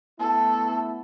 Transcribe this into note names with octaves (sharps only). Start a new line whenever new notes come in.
A3 B3 E4 A4